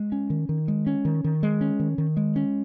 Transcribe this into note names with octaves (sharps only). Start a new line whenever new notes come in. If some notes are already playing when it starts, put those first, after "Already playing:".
Already playing: G#3
C#4
D#3
D#3
G#3
C#4
D#3
D#3
G#3
C#4
D#3
D#3
G#3
C#4